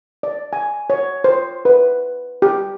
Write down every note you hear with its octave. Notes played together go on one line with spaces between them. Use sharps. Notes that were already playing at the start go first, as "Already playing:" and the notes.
D5
G#5
C#5
C5
B4
G4